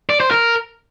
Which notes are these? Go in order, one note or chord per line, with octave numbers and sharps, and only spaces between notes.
D5
C5
A#4